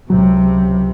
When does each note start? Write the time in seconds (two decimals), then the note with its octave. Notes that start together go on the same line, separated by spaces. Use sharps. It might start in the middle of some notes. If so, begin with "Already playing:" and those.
0.10 C#2 C3 F#3